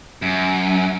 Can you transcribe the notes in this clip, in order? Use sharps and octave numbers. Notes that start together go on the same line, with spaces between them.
F#2